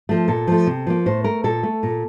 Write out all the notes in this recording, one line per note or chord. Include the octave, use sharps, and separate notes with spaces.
F3 A3
A#2 A4
F3 A3
C3
F3 A#3
A2 C5
A3 A#4
A#2 A4
A3
A#2